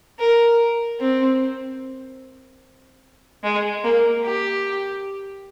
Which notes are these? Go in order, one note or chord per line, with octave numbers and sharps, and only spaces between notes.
A#4
C4
G#3
A#3
G4